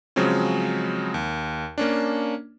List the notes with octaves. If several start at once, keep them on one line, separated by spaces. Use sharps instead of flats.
C#3 F3 F#3 G#3 C4 C#4
D#2
A#3 C#4 D4